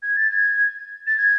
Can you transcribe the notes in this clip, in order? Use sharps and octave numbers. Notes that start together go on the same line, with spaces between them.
G#6
A6
G#6
A6
G#6